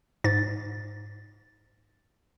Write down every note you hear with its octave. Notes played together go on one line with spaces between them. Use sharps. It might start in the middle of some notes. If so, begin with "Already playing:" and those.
G#2 A6